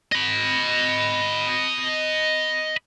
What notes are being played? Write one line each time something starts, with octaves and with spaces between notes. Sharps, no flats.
D#5 B5